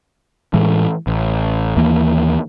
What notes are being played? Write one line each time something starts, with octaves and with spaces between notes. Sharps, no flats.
A2 E3 G#3
A1
D#2 E3 A#3